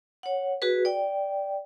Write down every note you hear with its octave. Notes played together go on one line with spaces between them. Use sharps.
C#5 F#5
F#4 G#4 B4
D5 G5